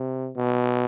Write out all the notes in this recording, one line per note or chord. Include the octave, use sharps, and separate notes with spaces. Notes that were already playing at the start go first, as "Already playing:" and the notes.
Already playing: C3
B2